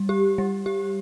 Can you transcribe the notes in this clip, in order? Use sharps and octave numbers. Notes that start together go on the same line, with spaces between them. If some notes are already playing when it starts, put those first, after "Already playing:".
Already playing: G3
G4
G3
G4